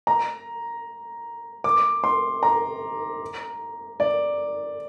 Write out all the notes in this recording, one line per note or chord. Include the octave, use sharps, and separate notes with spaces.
A#5
D6
C6
A#5
D5